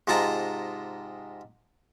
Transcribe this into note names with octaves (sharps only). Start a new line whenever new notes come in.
G#2 C3 G#3 F4 A5 A#5